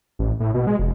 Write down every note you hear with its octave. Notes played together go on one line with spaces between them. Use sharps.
A1
A2
B2
G#3
F1